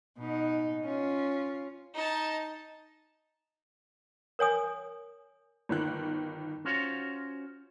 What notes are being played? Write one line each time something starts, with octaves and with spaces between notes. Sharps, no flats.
B2 D#4
C#4 F4
D#4 A5
A#4 C#5 G#5 D#6
G1 D#3 F#6
C#4 F4 F#4 C5 C#5 F5